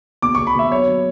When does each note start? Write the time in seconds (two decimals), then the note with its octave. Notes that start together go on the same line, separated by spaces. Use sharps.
0.22 B2 D6
0.35 B2 C#6
0.47 B5
0.55 B2 E5
0.71 F#3 C#5
0.88 F#3